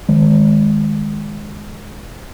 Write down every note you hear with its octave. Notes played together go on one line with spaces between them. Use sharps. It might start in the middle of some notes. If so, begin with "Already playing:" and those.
D#3 G#3